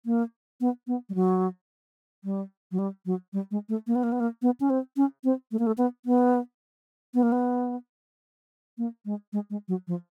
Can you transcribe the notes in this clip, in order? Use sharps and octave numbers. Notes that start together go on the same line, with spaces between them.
A#3
B3
B3
G3
F#3
G3
F#3
G3
F#3
G3
G#3
A3
A#3
B3
A#3
B3
A#3
B3
C#4
C4
C#4
C4
A3
A#3
A3
B3
B3
B3
A#3
B3
A#3
G#3
G#3
G#3
F#3
F3